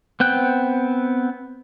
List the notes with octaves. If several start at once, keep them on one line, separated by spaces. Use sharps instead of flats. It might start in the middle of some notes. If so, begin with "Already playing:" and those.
B3 C4 G5 F#6